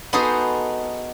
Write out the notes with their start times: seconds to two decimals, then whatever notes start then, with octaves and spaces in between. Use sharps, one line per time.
0.13 B3 D#4 F#4 G#4 A4 C5